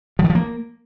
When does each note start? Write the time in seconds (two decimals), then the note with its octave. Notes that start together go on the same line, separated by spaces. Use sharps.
0.19 F3
0.24 D#3
0.30 F3
0.35 A#3